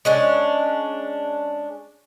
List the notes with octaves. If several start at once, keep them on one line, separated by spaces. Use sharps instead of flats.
G#3 C#4 D4